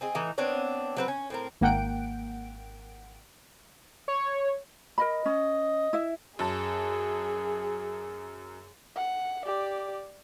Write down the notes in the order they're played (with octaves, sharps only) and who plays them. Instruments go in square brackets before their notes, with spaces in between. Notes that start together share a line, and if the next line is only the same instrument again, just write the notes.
[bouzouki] C4 G#4 D#5
A2 E3 D#4 E5
B3 C4 D4 C#5
F#3 C4 B4
C#4
A2 C4 A#4
[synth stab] G#1 A#3 F#5 G5 D7
[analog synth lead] C#5
[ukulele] A#4 D#5 B5
[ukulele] C#4 [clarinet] D#5
[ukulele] E4 E5
[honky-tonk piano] F#2 A5 [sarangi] G#4
[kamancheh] F#5
G4 D5